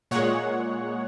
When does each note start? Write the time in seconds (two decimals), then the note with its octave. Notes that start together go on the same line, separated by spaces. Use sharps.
0.11 A#2 G#3 C#5 F#5